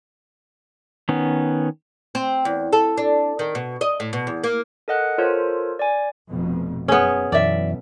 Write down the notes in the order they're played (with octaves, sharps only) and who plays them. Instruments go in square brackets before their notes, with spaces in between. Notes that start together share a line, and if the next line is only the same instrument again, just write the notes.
[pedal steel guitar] D#3 B3 C#4
[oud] C4
E2
A4
D4
D#3
B2
D#5
A2
B2
E2
A#3
[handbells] A4 A#4 D#5 F#5 F#6
F4 A4 A#4 C5 C#5
D5 G#5
[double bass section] F1 F2 B2
[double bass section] F#2 [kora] B3 C#4 [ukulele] G#4 C#5
[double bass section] B1 [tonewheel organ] F#2 E3 [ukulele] D5 E5